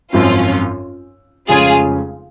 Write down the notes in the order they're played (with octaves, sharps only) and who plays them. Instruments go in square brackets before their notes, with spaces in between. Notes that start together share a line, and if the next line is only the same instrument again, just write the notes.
[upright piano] G#1 F#2 F3 C4 [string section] C#4 F4
[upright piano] F1 F2 C#3 G#3 C#4 [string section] F4 G#4